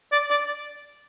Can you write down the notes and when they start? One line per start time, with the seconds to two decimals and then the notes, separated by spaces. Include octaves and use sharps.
0.12 D5
0.30 D5